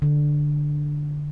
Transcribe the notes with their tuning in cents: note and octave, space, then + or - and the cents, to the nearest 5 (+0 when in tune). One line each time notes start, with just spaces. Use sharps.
D3 +5